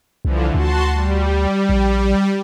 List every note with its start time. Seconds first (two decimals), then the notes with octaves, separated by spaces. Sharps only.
0.25 C2 D3 E3 F3
0.54 D2 F#4 A5 C6
0.93 G3
1.69 A#1